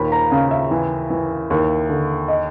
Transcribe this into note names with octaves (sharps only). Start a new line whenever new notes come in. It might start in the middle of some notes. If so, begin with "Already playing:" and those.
Already playing: D#2 A#2 B5
A#5
C#3 F5
E5
E3
E3
D#2
D3
D#5